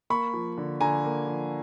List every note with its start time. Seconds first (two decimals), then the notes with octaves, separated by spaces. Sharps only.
0.10 A#3 B5 C#6
0.34 F3
0.58 D3
0.81 D3 G#5 A#5
1.04 A#3
1.27 F3